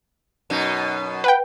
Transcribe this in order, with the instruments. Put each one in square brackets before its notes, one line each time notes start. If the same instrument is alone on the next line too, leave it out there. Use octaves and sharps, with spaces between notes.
[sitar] F#2 B2 D#4
[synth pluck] B4 F#5 G5